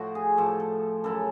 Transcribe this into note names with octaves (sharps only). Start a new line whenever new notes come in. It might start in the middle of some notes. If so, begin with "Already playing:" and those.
Already playing: A2 F3 F#4
G#4
A2 F3 A4
A4
F#2 C#3 F#3 A4